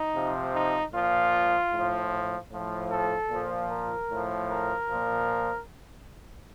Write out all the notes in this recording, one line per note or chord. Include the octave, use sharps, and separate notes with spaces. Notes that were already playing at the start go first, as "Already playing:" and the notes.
Already playing: D#4
C3 F3
D#4
A#2 F3 F4
A2 F3
A2 F3
A4
A#2 F3
A#4
A2 F3
A#4
F3
A#2